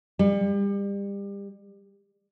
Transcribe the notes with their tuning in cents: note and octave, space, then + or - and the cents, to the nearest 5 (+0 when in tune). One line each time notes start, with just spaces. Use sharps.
G3 +30